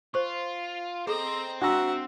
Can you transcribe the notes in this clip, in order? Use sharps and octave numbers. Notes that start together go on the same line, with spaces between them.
F4 C5 C#6
C4 G#4 A4 C5 D#5 A#5
D4 F#4 E5 F#5 A#5 E6